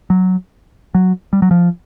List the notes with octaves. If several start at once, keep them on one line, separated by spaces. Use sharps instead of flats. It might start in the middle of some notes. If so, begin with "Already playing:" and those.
F#3
F#3
G3
F#3
F3